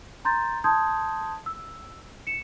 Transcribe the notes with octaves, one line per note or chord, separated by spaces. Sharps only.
A#5 C6 G6 A6
A5 C6 D#6 G6 G#6
E6
C#7 E7